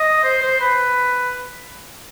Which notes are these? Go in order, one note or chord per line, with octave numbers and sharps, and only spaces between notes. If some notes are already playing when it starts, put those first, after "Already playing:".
Already playing: D#5
C5
C5
B4